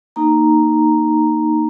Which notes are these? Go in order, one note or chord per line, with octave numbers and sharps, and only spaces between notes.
A#3 D#4 A#5